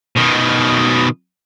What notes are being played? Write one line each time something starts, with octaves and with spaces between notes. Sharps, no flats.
B2 D#3